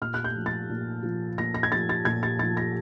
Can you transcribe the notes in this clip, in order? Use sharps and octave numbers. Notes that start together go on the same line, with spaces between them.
A#2 F6
F#6
G6
F3
A6
A#2
F3
A#2 A#6
A#6
G#6
F3 A6
A6
A#2 G#6
A6
F3 A6
A#6